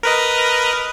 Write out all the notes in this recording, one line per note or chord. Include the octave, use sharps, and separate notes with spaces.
A#4 B4 D#5